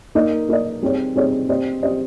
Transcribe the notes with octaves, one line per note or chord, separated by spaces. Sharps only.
A#3 D#4 A#4 D#5
A#3 D#4 A#4 D#5
G3 C4 D#4 G#4 C#5
G3 C4 D#4 G#4 C#5
C4 G4 C5 D#5
C4 G4 C5 D#5